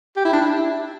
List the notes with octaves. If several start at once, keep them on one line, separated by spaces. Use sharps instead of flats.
G4
E4
D4
E4